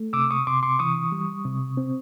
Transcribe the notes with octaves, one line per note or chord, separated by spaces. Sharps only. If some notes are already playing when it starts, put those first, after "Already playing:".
Already playing: A3
C3 D6 E6
C#6 D#6
C3 C6 D6
C6 D6
E3 C#6 D#6
G3
C3
C4